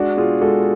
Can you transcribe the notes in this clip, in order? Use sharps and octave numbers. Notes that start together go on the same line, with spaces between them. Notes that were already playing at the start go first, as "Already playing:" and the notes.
Already playing: G#3 D4 F#4
B2 F4 G#4
G#3 F#4 A4